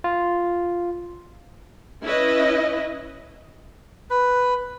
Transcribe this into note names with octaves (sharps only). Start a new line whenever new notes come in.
F4
C#4 E4 B4 D#5
B4